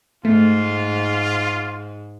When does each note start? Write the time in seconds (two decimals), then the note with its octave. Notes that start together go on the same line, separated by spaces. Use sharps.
0.25 G#2 A3 F4